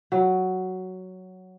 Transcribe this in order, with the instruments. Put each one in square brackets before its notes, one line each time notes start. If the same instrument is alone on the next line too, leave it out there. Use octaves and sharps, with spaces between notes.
[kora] F#3